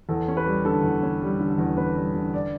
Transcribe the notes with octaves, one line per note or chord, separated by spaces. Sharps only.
E2 A4
C#4
B4
G3
D3 A4
E2
C#4
G3
D3
E2
C#4 B4
G3
D3
D5